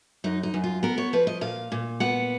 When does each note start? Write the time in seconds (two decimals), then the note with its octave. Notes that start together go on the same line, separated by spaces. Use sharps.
0.24 F#2 D#4
0.43 D#4
0.54 F#2
0.64 F4
0.83 B3 A#4
0.98 C#5
1.13 F3 B4
1.27 D#5
1.41 A#2 F5
1.72 A#2
2.00 B3 F#5